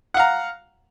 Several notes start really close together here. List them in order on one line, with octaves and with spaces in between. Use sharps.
F#5 F5 A#5